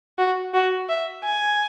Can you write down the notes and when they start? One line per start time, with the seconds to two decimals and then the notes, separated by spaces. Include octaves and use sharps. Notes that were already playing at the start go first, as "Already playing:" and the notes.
0.18 F#4
0.54 F#4
0.89 E5
1.24 G#5